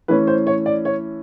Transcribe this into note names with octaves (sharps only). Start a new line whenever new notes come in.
E3 A3 C#4 B4
C5
C#5
D5
C#5